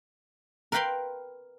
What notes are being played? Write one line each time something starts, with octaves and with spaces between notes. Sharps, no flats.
A#4 B4 F5 G5 B5 C6